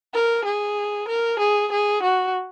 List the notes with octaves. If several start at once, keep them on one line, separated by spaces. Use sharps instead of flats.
A#4
G#4
A#4
G#4
G#4
F#4